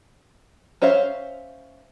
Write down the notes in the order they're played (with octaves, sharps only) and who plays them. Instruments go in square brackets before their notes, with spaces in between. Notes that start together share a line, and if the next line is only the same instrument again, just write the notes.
[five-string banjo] C#4 C5 C#5 E5 F5